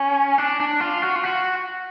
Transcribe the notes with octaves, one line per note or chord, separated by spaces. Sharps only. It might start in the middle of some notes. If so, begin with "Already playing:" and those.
Already playing: C#4
D4
D4
F4
F#4
F4
F#4